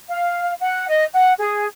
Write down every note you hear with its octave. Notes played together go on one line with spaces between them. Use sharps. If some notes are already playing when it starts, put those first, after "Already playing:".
F5
F#5
D#5
F#5
G#4